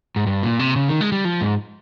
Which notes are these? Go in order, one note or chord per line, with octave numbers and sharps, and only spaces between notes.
G#2
G2
A#2
C3
C#3
D#3
G#3
G3
F3
G#2